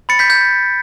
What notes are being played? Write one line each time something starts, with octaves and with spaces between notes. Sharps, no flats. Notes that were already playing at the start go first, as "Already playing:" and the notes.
B5 A6 C#7
G6 B6
G6